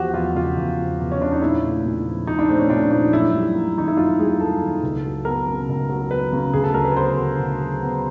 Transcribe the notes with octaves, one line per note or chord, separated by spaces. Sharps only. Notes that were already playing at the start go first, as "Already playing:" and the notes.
Already playing: E2 F3 F#4 G4
E2 F4
C#3 F4
E2
F3
E2
C#4
C#3 D4
D#4
A#2 E4
A3
A#2
F3
A#2 D#4
D4
A3 C4
C#4
A#2 D4
F3 D#4
F#2 E4
G3
A#3
D#3 D#4
E4
F#2 F4
G3 G#4
A#3 A4
D#3
C#2
F#3
B3 A#4
C#3
C#2
F#3
B3 B4
C#3
D2 G#4
A4
F#3 A#4
B4
B3 C5
D3
D2
F#3
B3